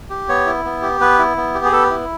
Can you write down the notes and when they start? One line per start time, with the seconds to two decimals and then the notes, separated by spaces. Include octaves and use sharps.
0.10 G4
0.29 B3 C#5
0.46 E4
0.65 B3
0.82 G4
1.00 B3 B4
1.19 E4
1.37 B3
1.54 G4
1.65 G#4
1.72 B3 A4
1.91 E4